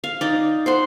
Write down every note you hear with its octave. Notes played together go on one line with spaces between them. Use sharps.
F5
D#4 D5
C5 F#5 C6